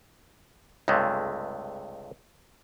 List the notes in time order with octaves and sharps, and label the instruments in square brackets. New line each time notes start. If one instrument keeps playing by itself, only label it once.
[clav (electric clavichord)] C#2 G2 C3 G#3 A3